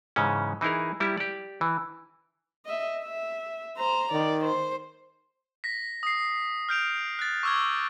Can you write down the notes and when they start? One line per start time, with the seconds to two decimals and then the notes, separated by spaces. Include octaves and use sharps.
0.16 G#2 C#3 E3 C#4
0.61 E3 D#4 E4 G#4 A#4
1.00 G3 A#3 E4 G4
1.17 G4 D5
1.61 E3
2.65 D#5 E5
2.99 E5
3.77 C5 A#5
4.12 D#3 D5
4.45 C5
5.64 A#6 B6
6.03 D#6 C7
6.69 F6 G6 D7 F7
7.19 F#6 A6
7.43 C#6 D6 E6 F6 G#6